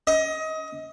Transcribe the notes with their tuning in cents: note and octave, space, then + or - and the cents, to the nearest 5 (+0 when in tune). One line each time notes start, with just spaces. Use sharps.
D#5 +25